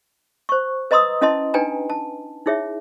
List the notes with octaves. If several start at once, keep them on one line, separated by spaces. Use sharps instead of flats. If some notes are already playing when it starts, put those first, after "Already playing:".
C5 C#6
B4 D#5 A#5 C6 D#6 E6
C#4 E4 D#5 A5 C6
D4 D#4 B4 G5 G#5 A#5
A5
D#4 E4 G#4 C#5 E5